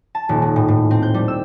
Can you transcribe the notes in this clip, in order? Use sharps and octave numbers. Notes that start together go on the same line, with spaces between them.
A5
D#1
G#3
A2
A2
C4
G6
G3
E6